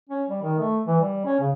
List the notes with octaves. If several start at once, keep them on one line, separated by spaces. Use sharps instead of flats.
C#4
G3
D#3
A3
E3
G3
C#4
C#3